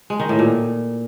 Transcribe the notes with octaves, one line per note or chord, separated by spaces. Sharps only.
G#3
D#3
A2
A#2